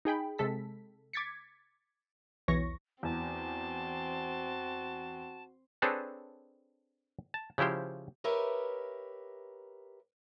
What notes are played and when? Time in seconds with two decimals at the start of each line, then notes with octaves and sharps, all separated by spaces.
0.05 D#4 G#4 G5 B5
0.38 C3 G#3 A4 B6
1.13 D6 G#6 A6 B6 C#7
2.48 B1 E2 E3 C#5 C#6 A#6
3.03 E2 C4 F#4 A5
5.82 C4 D4 G#4 A4 B4 C#5
7.34 A5
7.58 C#3 F3 E4 G4 C5
8.24 G4 A#4 B4 C#5 D#5 E5